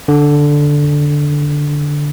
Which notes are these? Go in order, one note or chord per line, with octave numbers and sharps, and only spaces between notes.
D3